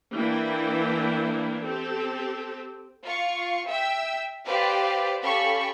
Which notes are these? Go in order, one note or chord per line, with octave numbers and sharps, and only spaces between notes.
E3 A#3 D4 E4 G5
C4 G4 A4
F4 F5 C#6
E5 G5 E6
G4 B4 C5 D5 F5
C#4 G4 A4 F5 B5 C#6